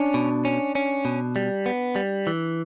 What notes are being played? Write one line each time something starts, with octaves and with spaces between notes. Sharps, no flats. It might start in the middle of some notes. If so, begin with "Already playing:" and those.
Already playing: C#4 D4
B2
C#4
C#4
B2
G3
B3
G3
E3